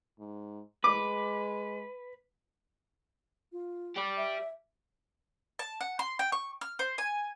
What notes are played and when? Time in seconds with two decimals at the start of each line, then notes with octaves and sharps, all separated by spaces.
0.19 G#2
0.84 G#3 B4 D6
3.52 F4
3.96 G4 D5
4.17 E5
5.59 A5
5.81 F#5
5.99 C6
6.19 G5
6.32 C#6
6.61 F6
6.79 C5
6.98 G#5